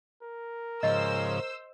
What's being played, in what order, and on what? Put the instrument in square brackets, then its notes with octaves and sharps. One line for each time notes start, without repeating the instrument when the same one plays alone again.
[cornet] A#4
[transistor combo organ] G#2 C#3 F3 [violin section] C5 E6 [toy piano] D#5